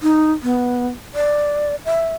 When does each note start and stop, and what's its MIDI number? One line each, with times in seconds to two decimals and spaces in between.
0.02 0.32 63
0.43 0.87 59
1.15 1.76 74
1.85 2.16 76